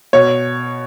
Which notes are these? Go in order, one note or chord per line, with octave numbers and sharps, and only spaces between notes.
B2 C#5